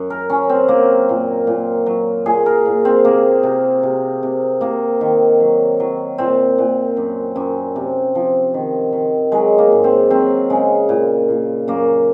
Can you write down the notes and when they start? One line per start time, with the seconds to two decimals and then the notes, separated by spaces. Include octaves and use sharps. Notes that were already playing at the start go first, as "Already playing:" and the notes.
Already playing: F#2
0.10 A#4
0.30 F#3 C#4
0.49 C4
0.68 F#3 A#3
1.09 A#2
1.47 A#2
1.86 F#3
2.26 A#2 G#4
2.46 A#4
2.66 A#2
2.85 C4
3.05 C3 A#3
3.43 C3
3.83 C3
4.23 C3
4.61 C3 A#3
5.01 D#3
5.40 F#3
5.80 F#3
6.18 A#2 C4
6.58 A#2
6.97 F#2
7.36 F#2
7.76 C3
8.15 F3
8.54 D#3
8.93 D#3
9.32 F#3 G#3
9.58 A#3
9.72 G#2
9.84 C4
10.10 F#3 C4
10.50 C#3 G#3
10.89 A#2
11.29 A#2
11.68 F#2 A#3